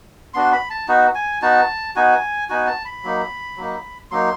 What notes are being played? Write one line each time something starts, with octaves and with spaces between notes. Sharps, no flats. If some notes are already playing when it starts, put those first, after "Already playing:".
B3 D4 F#4 C6
B5
A5
B3 D#4 F#4
G#5
B3 D#4 F#4 A5
B3 D#4 F#4 G#5
B3 D#4 F#4 G#5
A5
B5
F#3 A#3 D#4
F#3 A#3 D#4
F#3 A#3 D#4 C6